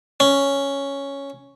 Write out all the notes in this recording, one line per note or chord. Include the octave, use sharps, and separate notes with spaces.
C#4